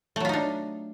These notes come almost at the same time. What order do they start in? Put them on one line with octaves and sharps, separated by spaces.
A3 F#3 F4 D#4 D4